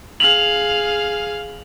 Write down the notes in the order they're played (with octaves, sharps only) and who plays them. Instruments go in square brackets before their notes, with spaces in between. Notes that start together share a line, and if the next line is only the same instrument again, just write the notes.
[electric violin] G#4 F5 [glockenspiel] F7 F#7